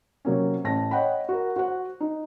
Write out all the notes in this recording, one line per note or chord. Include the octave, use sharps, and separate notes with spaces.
C3 F#3 A#3 C#4
A1 A5 A#6
C#5 D#5 F#5 G5 B5
F#4 A#4
F#4 C5 F#5
D#4